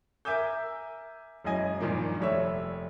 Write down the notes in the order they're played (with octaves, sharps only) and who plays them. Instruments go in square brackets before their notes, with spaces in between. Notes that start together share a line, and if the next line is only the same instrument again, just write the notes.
[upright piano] A#4 E5 G#5 D6 E6 G6
E1 F#2 E4 D#5 G#5
G2 A#2 D#3 F3 A#3
F1 G3 C#5 E5 E6